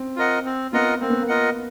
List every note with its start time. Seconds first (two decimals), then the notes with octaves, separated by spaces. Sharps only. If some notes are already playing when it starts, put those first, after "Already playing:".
Already playing: C4
0.16 F4 A#4 D#5 F#5
0.45 C4
0.72 B3 F4 A#4 D#5 F#5
1.01 A#3 C4
1.10 B3
1.20 A#3
1.28 F4 A#4 D#5 F#5